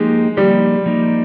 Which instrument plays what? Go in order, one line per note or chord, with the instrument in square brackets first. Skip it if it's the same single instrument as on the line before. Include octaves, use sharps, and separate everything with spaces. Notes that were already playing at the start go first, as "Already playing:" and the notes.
Already playing: [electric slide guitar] F3 A#3 D#4 G4 [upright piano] G#3
[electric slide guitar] F3 A#3 D#4 G4 [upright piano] G3
[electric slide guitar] F3 A#3 D#4 G4